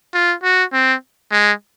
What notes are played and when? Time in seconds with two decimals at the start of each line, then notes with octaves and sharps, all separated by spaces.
0.14 F4
0.43 F#4
0.73 C4
1.31 G#3